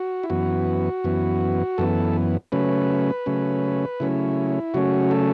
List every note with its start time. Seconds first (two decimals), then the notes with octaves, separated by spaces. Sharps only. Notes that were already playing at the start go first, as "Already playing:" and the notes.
Already playing: F#4
0.23 E4
0.30 F#2 E3 B3 F#4
1.04 F#2 E3 B3
1.78 F#2 E3 B3 A4
2.52 C#3 F#3 A3 C#4 B4
3.26 C#3 F#3 A3 C#4
4.00 C#3 F#3 A3 C#4 E4
4.74 C#3 F#3 A3 C#4 F#4
5.11 A4